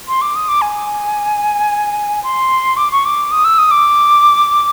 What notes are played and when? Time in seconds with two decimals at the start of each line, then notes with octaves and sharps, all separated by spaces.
0.08 C6
0.22 D6
0.36 D#6
0.48 D6
0.62 G#5
2.23 C6
2.77 D6
2.92 C#6
3.05 D6
3.32 D#6
3.45 E6
3.58 D#6
3.71 D6